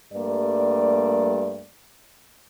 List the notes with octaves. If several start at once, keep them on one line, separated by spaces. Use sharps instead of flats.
G2 G3 A3 A#3 D5